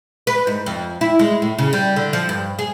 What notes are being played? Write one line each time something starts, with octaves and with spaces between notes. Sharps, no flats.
B4
G#2
F2
E4
G#3
A2
C#3
G3
D3
F3
G2
G#4